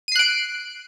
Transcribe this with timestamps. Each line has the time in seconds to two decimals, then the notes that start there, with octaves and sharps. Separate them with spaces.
0.08 D#7
0.12 C7
0.16 F#6
0.19 D7